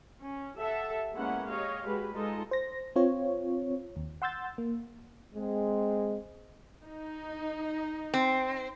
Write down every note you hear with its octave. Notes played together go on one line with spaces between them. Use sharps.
C#4
G4 A4 E5 F#5 A5
G#3 A#3 B3 C#4 E4 F#5
G4 C#5 D#5 F5
G#3 F#4 G4 B4
G#3 D#4 F4 A4 D#5
C5 A#6
C4 F4 C#5
D#2
F#5 C6 E6 G6 A6
A#3
G#3 C4
D#4
C4